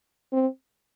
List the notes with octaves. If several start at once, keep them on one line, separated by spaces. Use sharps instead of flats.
C4